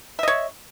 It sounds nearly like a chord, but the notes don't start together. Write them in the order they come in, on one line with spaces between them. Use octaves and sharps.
E5 D#5 C#5